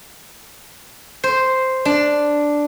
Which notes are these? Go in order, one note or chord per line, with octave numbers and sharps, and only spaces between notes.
C5
D4